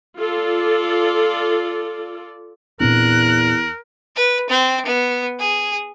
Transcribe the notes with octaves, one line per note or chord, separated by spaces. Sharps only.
F4 A4 D5
E2 A#2 C4 D4 A#4 F#6
B4
C4
B3
G#4